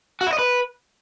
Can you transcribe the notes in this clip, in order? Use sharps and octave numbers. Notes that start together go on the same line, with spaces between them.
F#4
E4
D#5
B4